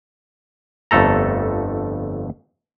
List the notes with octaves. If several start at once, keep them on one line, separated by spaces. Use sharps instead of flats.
G1 F2 A3 A4 A#5